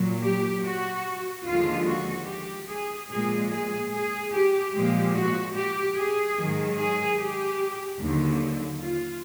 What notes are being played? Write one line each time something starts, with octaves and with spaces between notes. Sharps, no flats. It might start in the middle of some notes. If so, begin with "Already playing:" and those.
Already playing: A#2 F#3
G4
F#4
D#2 D3 F3 G#3 F4
F#4
G4
G#4
A#2 F3 G#3 G#4
G#4
G#4
G4
A#2 F3 G#3 G4
F#4
G4
G#4
G#2 D#3 F#3
G#4
G4
D#2 D3 F#3
F4